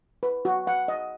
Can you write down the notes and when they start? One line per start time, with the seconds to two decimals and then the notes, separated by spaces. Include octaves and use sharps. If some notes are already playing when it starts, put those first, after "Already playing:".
0.23 B4
0.45 F#4
0.67 F#5
0.88 D#5